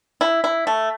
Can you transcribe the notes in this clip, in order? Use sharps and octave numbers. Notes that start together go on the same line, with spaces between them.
E4
E4
A3